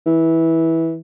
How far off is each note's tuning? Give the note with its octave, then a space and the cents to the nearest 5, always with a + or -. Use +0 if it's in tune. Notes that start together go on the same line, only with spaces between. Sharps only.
E3 -15